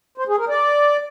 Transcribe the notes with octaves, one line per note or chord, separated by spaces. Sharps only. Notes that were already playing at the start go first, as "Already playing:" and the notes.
C5
G#4
A#4
D5